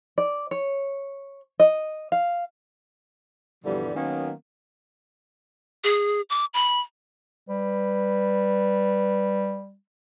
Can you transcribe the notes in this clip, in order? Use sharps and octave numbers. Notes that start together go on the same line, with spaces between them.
D5
C#5
D#5
F5
G2 B2 D3 E3 F3 G3
D#3 F#3 A#3 B3 C#4
G#4
D6
B5
G3 B4